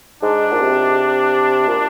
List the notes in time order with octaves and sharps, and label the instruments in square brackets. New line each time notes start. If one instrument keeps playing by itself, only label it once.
[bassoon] G#2 [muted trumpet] D4
[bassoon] A#2
C3
A#2